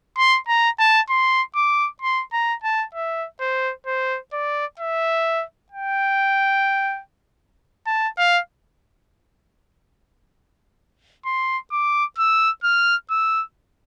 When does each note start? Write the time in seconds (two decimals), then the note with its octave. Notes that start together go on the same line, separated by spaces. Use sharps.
0.17 C6
0.48 A#5
0.79 A5
1.10 C6
1.55 D6
2.02 C6
2.33 A#5
2.64 A5
2.94 E5
3.41 C5
3.87 C5
4.33 D5
4.79 E5
5.72 G5
7.87 A5
8.18 F5
11.26 C6
11.72 D6
12.18 E6
12.64 F6
13.11 E6